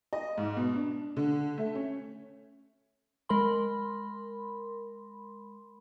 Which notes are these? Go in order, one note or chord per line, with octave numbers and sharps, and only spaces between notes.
D#5
G#2
B2
D4
D3
A3
C#4
G#3 A#4 B5 C6